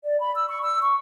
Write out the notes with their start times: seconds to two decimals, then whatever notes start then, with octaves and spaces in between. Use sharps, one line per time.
0.03 D5
0.19 B5
0.35 E6
0.48 C#6
0.63 E6
0.81 C#6